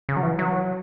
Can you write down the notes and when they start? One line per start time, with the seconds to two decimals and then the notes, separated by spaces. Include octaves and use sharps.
0.09 C#3
0.17 F#3
0.23 E3
0.39 F#3